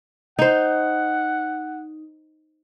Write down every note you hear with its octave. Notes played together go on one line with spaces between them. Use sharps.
D#4 C5 F#5